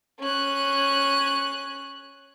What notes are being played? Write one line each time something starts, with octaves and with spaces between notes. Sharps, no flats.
C#4 F#6